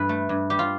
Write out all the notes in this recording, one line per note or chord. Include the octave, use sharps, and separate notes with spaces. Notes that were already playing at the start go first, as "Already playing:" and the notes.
Already playing: G2 E3 A4 B4
A3
G2
G3 G4
F4